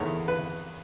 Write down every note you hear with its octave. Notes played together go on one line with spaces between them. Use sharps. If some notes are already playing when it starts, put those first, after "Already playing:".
Already playing: E2 D#3 A3 C#5
B4